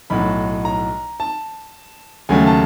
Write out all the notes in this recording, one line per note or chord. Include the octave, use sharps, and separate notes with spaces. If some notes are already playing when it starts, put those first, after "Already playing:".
B1 A2 F#3 B5
A#5
A5
D#2 C#3 F#3 A3 G#5
A5